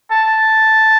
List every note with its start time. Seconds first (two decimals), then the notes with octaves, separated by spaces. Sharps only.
0.11 A5